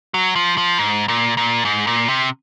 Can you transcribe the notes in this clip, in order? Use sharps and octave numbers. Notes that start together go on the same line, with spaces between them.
F#3
F3
F3
G#2
A#2
A#2
G#2
A#2
C3